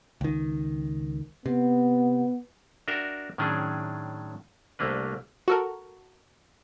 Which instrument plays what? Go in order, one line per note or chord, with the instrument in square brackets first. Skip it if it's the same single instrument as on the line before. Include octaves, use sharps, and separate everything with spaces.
[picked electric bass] C#2 D#3
[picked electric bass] C3 [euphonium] B3
[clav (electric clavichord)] D4 F#4 A#4 E5 G5
A2 D#3 F#3 C#4 D4 G#4
C2 A3 A#3 D4 B4
[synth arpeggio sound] F#4 A4 A#4